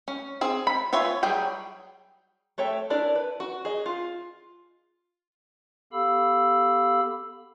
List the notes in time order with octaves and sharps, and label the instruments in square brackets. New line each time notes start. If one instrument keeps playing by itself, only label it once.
[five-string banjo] C#4
C4 G#4
B5
F4 B4 C#5 E5 G#5
F#3 G3 G#4 G5
A3 A4 C#5 E5 G5
D4 E4 A#4 D5
B4
F#4
G#4 D#5
F4
[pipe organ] B3 G4 A4 F5 B5 E6